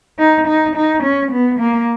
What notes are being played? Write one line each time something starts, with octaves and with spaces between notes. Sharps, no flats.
D#4
D#4
D#4
C#4
B3
A#3